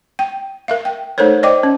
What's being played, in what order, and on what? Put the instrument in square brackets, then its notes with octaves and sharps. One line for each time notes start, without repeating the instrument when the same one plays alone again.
[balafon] G5
A#4 E5 F5
G5
A3 D#4 A4 A#4 C5 C#5
C5 D5 D#5 G5 D6
C#4